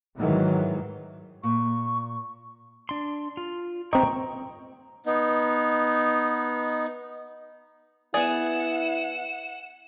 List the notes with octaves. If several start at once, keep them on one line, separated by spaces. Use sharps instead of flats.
G#2 D#3 E3 F#3 G#3
A#2 C#6
D4 C6
F4
C4 D#5 G5 A#5 C#6
B3 D#4
B3 E4 G#4 D5 F#5 E7